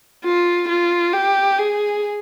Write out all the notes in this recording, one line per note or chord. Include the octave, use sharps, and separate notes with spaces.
F4
F4
G4
G#4